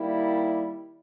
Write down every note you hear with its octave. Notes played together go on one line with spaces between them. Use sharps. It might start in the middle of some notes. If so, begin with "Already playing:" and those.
Already playing: D#3 G3 A#3 E4